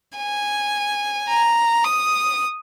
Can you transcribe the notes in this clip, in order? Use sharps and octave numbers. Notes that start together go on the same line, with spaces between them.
G#5
A#5
D#6